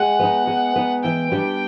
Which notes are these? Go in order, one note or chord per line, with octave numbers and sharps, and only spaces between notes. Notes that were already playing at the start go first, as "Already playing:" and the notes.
Already playing: G#3 F#5
B3 D#4
G#3
B3 D#4
E3 G5
G3 B3 D4